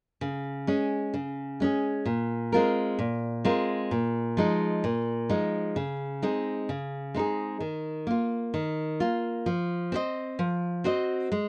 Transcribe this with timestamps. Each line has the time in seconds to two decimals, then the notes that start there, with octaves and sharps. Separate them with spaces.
0.21 C#3
0.67 G#3 C#4 G#4
1.14 C#3
1.60 G#3 C#4 G#4
2.06 A#2
2.52 G#3 C4 F4 A#4
2.99 A#2
3.45 G#3 C4 F4 A#4
3.91 A#2
4.37 F3 G#3 D#4
4.84 A#2
5.29 F3 G#3 D#4
5.76 C#3
6.22 G#3 C4 D#4 G#4
6.69 C#3
7.14 G#3 C4 D#4 G#4
7.60 D#3
8.07 A#3 F4
8.54 D#3
9.00 A#3 F4
9.46 F3
9.92 C4 F#4 C5 D#5
10.39 F3
10.84 C4 F#4 C5 D#5
11.32 G#3